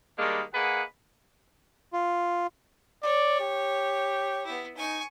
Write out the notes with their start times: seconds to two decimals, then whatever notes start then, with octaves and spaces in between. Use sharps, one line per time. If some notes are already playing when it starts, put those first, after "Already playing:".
0.19 D#3 G3 G#3 A#3 D4
0.54 A#3 G#4 B4 D#5 F#5
1.93 F4
3.03 C#5 D5
3.41 G4
4.46 B3 E4
4.77 D#4 G#5 C#6